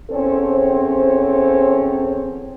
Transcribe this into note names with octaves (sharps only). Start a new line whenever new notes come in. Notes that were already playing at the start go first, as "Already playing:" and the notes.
E2 C4 C#4 A4 C5 C#5